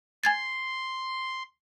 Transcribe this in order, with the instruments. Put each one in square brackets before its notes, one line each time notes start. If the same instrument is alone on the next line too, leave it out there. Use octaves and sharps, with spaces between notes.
[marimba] G#5 G#6 A6 [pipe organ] C6